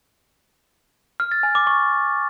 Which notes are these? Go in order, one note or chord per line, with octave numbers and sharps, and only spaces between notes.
F6
A6
G#5
D6
C#6